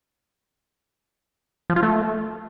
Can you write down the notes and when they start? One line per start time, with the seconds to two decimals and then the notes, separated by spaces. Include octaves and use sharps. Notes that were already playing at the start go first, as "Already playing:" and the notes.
1.70 F3
1.76 F4
1.83 A3